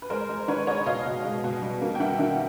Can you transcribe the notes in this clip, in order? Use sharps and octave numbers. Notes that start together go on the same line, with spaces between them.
B4
G#3 A#4 C5
G#3
D#3 B4 C#5
G#3 C#5 D#5
B2 D#5 F5
B2
G#3
B2
G3
A#3
G5
D#3 E5 F#5
D#3